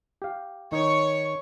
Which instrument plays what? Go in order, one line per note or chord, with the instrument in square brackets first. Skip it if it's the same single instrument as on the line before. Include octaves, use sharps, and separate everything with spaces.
[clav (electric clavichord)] G4 F5
[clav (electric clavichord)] D#3 D#4 [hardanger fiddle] C#5 C#6